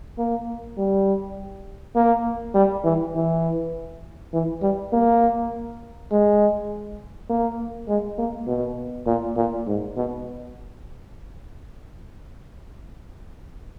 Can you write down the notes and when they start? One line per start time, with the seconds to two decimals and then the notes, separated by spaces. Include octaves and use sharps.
0.18 A#3
0.78 G3
1.95 A#3
2.55 G3
2.84 E3
3.15 E3
4.33 E3
4.62 G3
4.93 A#3
6.11 G#3
7.29 A#3
7.88 G#3
8.18 A#3
8.47 B2
9.07 A#2
9.37 A#2
9.67 G#2
9.96 B2